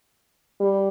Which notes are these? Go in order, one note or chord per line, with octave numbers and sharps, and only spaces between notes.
G3